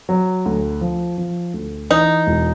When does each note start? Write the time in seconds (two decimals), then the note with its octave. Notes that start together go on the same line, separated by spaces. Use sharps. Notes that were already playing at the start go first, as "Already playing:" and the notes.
0.09 F#3
0.46 D2
0.81 F3
1.18 F3
1.54 D2
1.90 E3 D#4
2.27 E1